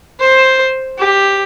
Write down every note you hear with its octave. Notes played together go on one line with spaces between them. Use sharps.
C5
G4